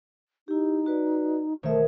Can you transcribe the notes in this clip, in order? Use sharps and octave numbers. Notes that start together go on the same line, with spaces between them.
D#4 E4 G4
F#4 B4 D5
B1 D#3 A3 C5 C#5 E5